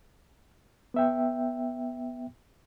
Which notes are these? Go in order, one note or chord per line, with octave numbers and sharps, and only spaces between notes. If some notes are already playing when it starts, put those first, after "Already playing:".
B3 E5 G5